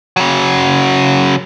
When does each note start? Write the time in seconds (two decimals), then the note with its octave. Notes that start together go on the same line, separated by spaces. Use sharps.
0.17 C#3 F#3